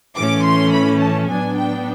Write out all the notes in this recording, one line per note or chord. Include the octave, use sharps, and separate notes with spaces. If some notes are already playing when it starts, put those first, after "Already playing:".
A2 E3 A3 C#4 D6
C6
B5
A5
A2 F#3 B3 D4 G#5
G5